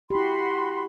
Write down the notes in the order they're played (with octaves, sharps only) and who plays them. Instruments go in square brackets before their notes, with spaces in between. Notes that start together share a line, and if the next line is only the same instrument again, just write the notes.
[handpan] E4 G4 [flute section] F#4 B5 C6